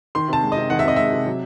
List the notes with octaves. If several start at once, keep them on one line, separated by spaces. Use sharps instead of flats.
D#3 C6
C3 A5
G#3
C3 D#5
D#3 F#5
E5
C3 D#5
G#3 E5
C3
F#3